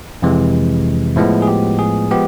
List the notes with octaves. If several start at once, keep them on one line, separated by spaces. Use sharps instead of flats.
F2 C3 E3 G#3
A2 F3 G#3 B3 E4
G#4
G4
G#4
F3 G#3 B3 G4